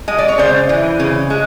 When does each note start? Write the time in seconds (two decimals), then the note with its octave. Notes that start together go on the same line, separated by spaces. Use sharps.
0.08 G#3 D#5
0.18 D5
0.28 C#5
0.38 C#3 C5 D5
0.69 E3
1.00 C#3
1.30 G#3